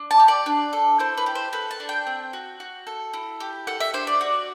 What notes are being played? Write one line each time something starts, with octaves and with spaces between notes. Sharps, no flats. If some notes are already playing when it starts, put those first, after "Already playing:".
Already playing: D4
A5
G4
D5
D4
A4
E4 C5
B4
G4
C5
A4 B4
A5
D4
G5
C4
F#4
F#4
A4
E4
G4
A4 F#5
E5
D4 C5
D5
F#4